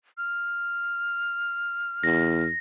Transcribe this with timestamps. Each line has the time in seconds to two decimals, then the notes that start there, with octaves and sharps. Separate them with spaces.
0.18 F6
2.04 E2 A#6